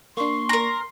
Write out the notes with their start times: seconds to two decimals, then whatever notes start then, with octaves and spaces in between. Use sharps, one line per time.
0.17 A#3 D4 C6 C#6
0.49 A#4 A#5